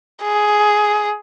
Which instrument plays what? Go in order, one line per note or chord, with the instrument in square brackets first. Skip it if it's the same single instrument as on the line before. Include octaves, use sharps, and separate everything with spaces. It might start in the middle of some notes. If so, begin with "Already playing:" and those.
[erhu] G#4